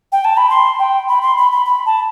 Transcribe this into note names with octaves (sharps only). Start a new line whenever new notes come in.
G5
A5
B5
C6
G5
B5
C6
B5
B5
B5
A5